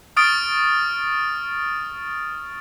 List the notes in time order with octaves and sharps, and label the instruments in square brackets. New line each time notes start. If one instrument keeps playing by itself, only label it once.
[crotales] C#6 D#6 F6 A6 D7